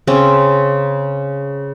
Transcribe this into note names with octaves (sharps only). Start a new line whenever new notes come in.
C#3 C4 C#4